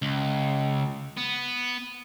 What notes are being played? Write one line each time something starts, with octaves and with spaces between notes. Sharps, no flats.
C#2
B3